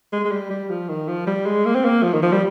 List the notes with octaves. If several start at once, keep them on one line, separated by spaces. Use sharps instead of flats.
G#3
G#3
G3
G3
F3
D#3
F3
G3
G#3
A#3
C4
A#3
F3
D#3
F3
G3